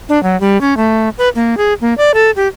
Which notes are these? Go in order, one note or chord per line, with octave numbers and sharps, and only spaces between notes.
D4
F#3
G3
C#4
A3
B4
A#3
G#4
A#3
D5
A4
G4